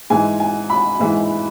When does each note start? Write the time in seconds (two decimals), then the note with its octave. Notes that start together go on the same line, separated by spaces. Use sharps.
0.10 G#2 E3 G#3 G#5
0.40 G#5
0.70 B5
0.99 G#2 E3 G#3